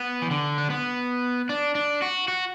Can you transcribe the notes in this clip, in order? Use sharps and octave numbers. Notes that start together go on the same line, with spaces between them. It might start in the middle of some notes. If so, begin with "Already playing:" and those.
Already playing: B3
E3
D3
D4
B3
D4
D4
F#4
F#4